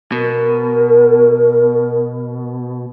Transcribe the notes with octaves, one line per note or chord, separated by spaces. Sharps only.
B2 A#4